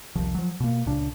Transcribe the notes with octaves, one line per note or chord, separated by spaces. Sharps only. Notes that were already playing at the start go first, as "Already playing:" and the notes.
F1 C2 D#3 F3
F3 F#3
B2 A#3
C#2 A#2 C#3 D4